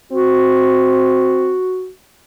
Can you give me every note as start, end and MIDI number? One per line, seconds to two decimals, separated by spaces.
0.12 1.55 60
0.12 1.90 66